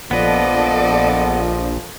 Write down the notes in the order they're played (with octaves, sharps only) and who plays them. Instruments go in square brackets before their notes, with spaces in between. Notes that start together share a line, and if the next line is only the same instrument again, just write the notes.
[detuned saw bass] A#1 [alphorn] F3 [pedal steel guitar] B3 B4 [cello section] A4 D5 D#5